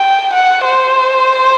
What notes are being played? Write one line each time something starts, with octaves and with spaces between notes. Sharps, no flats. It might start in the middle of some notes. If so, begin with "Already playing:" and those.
Already playing: G5
F#5
C5